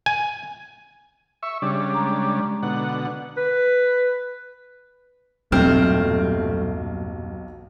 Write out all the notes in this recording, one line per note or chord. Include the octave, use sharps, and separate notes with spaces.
G#5
E5 C#6
C#3 G3 D4
G#3 A#5
B2 D3 F#5
B4
B1 E2 G2 A#2 A3 C4 G4 F6